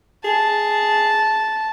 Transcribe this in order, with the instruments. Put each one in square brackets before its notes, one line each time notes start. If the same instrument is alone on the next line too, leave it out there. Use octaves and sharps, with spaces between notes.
[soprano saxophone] G#4 [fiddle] A5